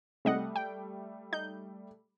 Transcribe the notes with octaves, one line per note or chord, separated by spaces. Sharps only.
C3 G3 A3 D#5 F#5
G5
D#4 G6